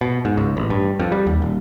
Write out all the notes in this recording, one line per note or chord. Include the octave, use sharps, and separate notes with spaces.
B2
G#2
C#2
A1
G2
F2
G3
D#2
D#1